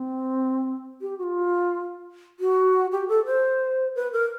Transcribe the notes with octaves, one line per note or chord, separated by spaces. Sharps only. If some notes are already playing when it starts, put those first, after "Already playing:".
Already playing: C4
G4
F#4
F4
F#4
G4
A4
C5
B4
A#4